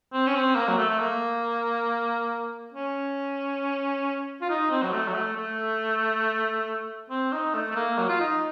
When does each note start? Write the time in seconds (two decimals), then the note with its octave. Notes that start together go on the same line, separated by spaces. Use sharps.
0.13 C4
0.27 C#4
0.35 C4
0.56 A#3
0.68 F#3
0.78 A3
0.90 A3
1.00 A#3
2.74 C#4
4.42 F4
4.50 D#4
4.70 C4
4.83 F#3
4.93 A3
5.07 F#3
5.15 A3
5.36 A3
7.10 C4
7.33 D#4
7.54 A3
7.71 A3
7.76 A#3
7.98 F#3
8.09 F4
8.20 D#4